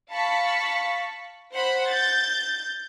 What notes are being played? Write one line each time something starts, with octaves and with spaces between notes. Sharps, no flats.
F5 A5 B5 C#6 B6
C5 F#5 B5
G6 A6